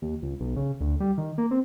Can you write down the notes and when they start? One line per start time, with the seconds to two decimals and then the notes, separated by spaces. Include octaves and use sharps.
0.02 D#2
0.22 C#2
0.40 B1
0.56 C#3
0.80 D2
1.00 G3
1.18 D#3
1.38 A#3
1.51 C4